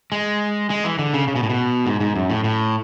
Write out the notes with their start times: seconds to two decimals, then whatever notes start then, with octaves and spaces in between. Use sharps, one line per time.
0.12 G#3
0.70 G#3
0.84 E3
0.99 D3
1.14 C#3
1.28 C#3
1.36 B2
1.43 A2
1.50 B2
1.86 G#2
2.00 G#2
2.16 F#2
2.30 A2
2.44 A2